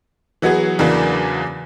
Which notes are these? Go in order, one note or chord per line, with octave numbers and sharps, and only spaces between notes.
E3 F#3 B3 F#4 G#4
E2 C#3 E3 F#3 A#3 D4